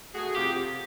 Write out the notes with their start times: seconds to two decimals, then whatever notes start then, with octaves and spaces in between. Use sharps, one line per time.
0.14 A3 F#4 G#4
0.35 C3 F4 G4